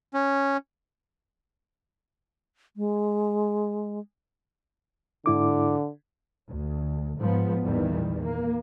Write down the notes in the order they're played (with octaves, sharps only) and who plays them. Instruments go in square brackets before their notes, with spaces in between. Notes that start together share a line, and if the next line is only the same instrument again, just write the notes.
[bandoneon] C#4
[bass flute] G#3
[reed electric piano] G#2 E4 D6 [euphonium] D3
[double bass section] D2
G#2 F3 B3
A#1 E2 A#2 D#3 E3 G3
A#3